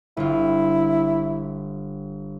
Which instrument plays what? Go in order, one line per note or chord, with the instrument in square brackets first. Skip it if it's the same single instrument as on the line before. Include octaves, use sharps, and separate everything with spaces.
[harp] G1 F4 [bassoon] E4